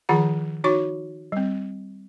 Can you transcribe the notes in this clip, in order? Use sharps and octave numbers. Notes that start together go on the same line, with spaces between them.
D#3 F3 F4 G#4 F#5 A#5
D#4 F#4 C#5 C#6
G3 C4